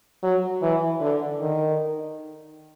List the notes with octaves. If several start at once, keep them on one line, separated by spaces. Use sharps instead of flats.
F#3
E3
D3
D#3